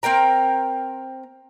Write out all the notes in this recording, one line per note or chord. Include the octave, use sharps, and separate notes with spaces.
C4 A#4 G5 A#5